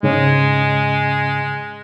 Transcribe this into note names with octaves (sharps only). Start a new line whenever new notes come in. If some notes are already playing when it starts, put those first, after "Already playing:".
G#2 C#3 G#3 C#4